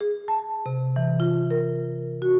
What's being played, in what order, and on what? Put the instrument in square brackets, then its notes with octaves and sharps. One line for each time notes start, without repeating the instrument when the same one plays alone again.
[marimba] G#4
A5
C3
E3
F4
A#4
F#4